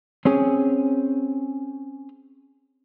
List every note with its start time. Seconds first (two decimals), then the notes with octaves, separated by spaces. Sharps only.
0.25 C4 C#4 G#4